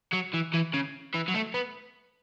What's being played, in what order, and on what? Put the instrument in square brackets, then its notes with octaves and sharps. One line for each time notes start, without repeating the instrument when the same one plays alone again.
[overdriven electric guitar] F#3
E3
E3
C#3
E3
F#3
A3
B3